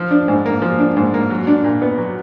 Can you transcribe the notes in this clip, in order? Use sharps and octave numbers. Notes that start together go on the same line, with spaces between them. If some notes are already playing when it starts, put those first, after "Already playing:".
Already playing: F3
D4
G#2
A#3
F3
D4
G#2
A#3
F#3
D4
A#2
B3
F#3